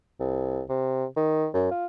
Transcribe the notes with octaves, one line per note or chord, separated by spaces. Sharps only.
C2
C3
D#3
F#2
F4